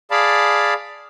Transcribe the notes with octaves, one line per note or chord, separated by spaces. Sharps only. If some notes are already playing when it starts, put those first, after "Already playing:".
G#4 D5 F5 A5 B5